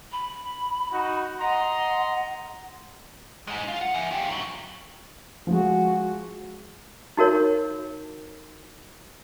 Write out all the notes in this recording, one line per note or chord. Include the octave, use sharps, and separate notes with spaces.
B5
D#4 F#4
D#5 F#5 A#5 C6
F#2 G#3
F4
F#5
G#4 E5
F4 G4
E2 F#3
F3 G#3 F#4
D#4 F#4 A#4 C#5